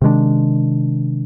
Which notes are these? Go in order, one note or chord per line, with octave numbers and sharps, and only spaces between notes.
C3 D#3 G#3 D4